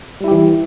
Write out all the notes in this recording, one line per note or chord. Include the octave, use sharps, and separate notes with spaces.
E3 G3 E4 G4